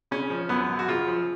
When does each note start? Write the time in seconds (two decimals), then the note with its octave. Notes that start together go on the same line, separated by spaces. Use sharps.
0.11 C#3 C#4
0.30 F3
0.49 F#2 B3
0.69 F#2
0.79 F#4
0.88 C#3 F4
1.08 F3